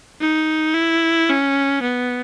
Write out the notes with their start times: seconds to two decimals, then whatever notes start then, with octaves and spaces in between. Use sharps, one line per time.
0.20 D#4
0.74 E4
1.29 C#4
1.82 B3